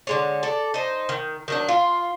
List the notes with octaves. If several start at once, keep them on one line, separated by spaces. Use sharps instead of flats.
D3 G#3 C#5
A4 D5
D#4 C5
D#3
D#3 F#3 D4
F4